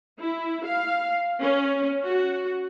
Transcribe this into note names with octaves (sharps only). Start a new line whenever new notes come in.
E4
F5
C#4
F#4